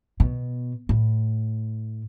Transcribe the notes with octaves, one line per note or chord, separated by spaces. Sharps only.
B2
A2